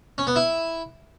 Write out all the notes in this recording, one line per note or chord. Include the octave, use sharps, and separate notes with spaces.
C#4
B3
E4